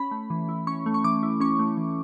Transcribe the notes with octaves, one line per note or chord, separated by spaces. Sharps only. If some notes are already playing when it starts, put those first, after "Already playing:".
Already playing: C#4 B5
A3
E3
E4
C#4 C#6
A3
C#6
E3 D6
E4
C#4 C#6
A3
E3